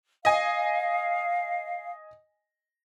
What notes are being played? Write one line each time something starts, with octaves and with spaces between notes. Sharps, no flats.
D#5 F5 G#5